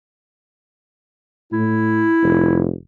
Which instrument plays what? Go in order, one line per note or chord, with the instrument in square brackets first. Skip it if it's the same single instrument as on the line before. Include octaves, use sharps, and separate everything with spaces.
[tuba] A2 [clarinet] E4
[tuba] F1